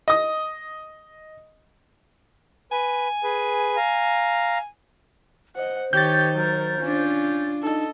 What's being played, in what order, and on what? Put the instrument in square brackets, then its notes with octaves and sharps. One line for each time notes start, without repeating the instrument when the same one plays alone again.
[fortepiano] D#5 D#6
[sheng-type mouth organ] B4 [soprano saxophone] G#5
[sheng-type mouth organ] G#4 B4
F5 A#5
[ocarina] C5 [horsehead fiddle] D#5 F#5
[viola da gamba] D#3 [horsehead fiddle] G4 C#5 [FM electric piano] G6 A6
[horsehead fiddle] F#3 A#4
[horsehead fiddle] C#4 [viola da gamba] D4 F4
[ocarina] D#4 [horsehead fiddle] A4 D#5